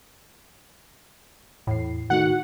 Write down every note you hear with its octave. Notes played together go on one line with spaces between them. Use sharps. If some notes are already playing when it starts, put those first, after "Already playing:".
E2 A2 C7
D#3 A3 D#4 F#4 F#5